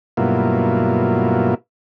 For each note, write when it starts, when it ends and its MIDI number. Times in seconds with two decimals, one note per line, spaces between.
0.17 1.55 43
0.17 1.55 47
0.17 1.55 54
0.17 1.55 58
0.17 1.55 64
0.17 1.55 65